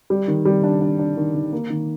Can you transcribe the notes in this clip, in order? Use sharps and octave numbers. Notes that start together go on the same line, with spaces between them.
G3
D#3
G3
D4
D4
D4
D#3
D#3
A#3
D#3